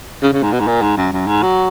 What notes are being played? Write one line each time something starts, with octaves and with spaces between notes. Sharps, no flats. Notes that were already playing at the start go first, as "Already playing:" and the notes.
C#3
C#3
G#2
B2
G#2
A#2
G#2
F#2
F#2
G#2
F#3